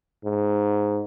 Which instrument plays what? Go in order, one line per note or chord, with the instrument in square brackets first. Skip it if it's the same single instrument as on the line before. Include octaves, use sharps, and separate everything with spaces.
[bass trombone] G#2